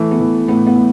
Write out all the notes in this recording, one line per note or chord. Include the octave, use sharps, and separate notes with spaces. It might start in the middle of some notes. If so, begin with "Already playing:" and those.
Already playing: E3 A3
B3
E3
A2 B3
B3
A2